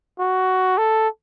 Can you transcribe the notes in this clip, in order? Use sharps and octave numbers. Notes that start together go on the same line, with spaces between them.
F#4
A4